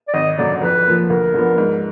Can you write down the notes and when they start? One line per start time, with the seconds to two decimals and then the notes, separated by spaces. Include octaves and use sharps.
0.08 D5
0.14 G#1 D#5
0.38 F#2 D3 F#3 D4 D5
0.62 F2 B4
0.86 F3 A#3
1.10 D2 A#4
1.34 D3 F3 B3
1.58 G#2